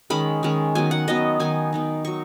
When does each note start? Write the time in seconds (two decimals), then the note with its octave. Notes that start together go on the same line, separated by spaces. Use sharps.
0.10 D#3 G#3 C#4 B5
0.43 D#3 G#3 C#4
0.75 D#3 F#3 B3 G#5
0.91 F#5
1.07 D#3 F#3 B3 D#5
1.40 D#3 B3 D#4 G#5
1.73 D#3 B3 D#4
2.05 F#3 D#4 C#6